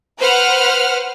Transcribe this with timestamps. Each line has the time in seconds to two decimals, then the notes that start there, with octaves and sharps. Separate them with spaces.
0.19 B4 C5 F#5 F6